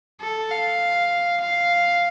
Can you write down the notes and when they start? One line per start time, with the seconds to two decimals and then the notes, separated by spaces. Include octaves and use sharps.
0.21 A4
0.52 F5
1.42 F5